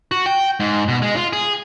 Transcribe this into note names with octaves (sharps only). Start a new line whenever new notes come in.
F#4
G5
G#2
B2
G#3
F4
G#4